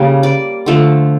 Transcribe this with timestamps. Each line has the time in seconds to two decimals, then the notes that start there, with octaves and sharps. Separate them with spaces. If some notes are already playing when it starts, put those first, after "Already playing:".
Already playing: C#3 G3 A#3
0.23 D5
0.66 D3 F3 A3